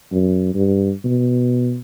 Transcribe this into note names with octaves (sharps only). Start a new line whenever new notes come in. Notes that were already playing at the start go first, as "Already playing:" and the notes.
F#2
G2
B2